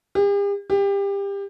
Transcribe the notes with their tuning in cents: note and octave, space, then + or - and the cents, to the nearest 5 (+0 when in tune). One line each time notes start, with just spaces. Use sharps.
G4 +45
G4 +25